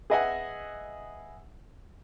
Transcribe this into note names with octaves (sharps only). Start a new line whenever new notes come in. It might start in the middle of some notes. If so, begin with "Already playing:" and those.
G#4 B4 D#5 E5 F#5 G#5